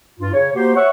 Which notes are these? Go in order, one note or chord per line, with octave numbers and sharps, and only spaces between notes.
G2 F4
C#3 C#5
A#3 F#4 G4 C5
C#5 E5 F#5 C#6